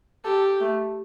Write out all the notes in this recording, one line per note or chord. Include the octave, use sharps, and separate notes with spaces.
G4 A4
A3